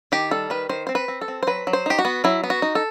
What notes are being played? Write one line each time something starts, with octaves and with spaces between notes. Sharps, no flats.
D#3 G4
G3 A4
D#3 B4
D#3 C5
C4 C5
B4
C4
A4
C4
C5
F#3 B4
F#3
C5
D#4 G4
F#4
B3
F#3 E4
B3
F#4
D#4
A4